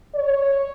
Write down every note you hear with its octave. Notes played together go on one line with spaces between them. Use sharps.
C#5